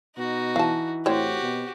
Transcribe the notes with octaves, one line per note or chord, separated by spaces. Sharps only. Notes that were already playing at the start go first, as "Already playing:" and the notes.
B2 D#4 F#4
E3 F5 A5
A2 C4 F#4 G4 C5 C#5
B2